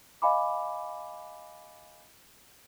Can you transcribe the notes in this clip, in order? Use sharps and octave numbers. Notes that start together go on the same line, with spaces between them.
D#5 F5 G#5 B5 D6